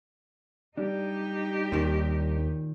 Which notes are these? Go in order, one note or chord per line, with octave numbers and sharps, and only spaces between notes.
G3 D4 D#4 G4
D#2 A#2 D#3